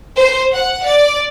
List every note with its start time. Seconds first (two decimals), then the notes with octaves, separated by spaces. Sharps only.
0.16 C5
0.53 F#5
0.85 D5